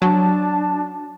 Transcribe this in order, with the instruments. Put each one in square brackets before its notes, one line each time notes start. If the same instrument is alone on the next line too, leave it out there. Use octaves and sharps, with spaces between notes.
[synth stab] F#3 [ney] D4 [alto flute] A5